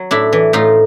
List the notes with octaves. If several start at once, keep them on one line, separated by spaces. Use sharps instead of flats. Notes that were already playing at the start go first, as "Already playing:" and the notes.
Already playing: F#3
A2 D4 E4
E3
A2 D#4 F4